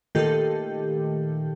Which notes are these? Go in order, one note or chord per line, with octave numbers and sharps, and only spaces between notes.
A#2 D#3 A3 F4 G4 A4